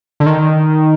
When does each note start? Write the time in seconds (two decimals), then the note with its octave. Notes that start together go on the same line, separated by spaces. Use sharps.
0.20 D3
0.26 D#3